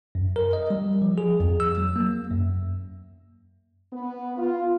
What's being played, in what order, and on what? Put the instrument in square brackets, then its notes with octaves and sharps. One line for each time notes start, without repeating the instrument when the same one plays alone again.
[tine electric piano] F#2
A#4
D#5
G3
F3
G#4
F2
E6
F#3
A#3
F#2
[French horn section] B3
F4